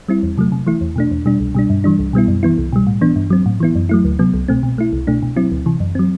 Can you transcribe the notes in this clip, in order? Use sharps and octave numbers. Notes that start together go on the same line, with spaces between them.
G3 C4 E4
E2
C3 F#3 A3
C3
E3 A3 E4
E2
B2 A3 D4
E2
B2 G3 D4
C2
B2 G3 D4
G2
E3 G3 D4
C2
B2 G3 B3 E4
F#2
E3 B3 E4
C2
B2 G3
A2
E3 B3 D4
G2
F#3 C4
A2
E3 B3 E4
F#2
F#3 A3 E4
D2
C3 F#3 B3
C2
B2 A3 C4
B2
A3 E4
C2
B2 A3 D4
B2
F#3 C4 E4
D2
C3 E3
F#2
F#3 C4